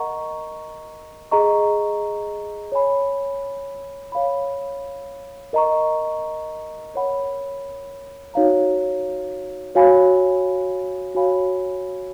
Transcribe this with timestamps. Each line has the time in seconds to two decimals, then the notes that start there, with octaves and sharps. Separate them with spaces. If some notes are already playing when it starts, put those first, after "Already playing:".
Already playing: A#4 D#5 F#5 A#5 C#6
1.31 G#4 D#5 A#5 C#6
2.72 C#5 G#5 B5
4.12 C#5 F5 B5
5.53 A#4 D#5 A#5 C#6
6.94 A#4 C#5 F#5 B5
8.34 D#4 F#4 C#5 F5 A#5
9.75 F#4 C#5 F5 G#5 B5
11.15 F#4 C#5 F5 G#5 B5